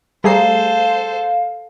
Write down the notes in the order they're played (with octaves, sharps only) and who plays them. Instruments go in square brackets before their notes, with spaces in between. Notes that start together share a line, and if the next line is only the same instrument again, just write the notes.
[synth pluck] G3 A#5 [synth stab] A3 G#4 C7 [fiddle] A4 C5 [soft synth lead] F5